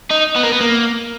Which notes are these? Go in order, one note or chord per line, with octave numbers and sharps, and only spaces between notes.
D#4
B3
A#3
B3
A#3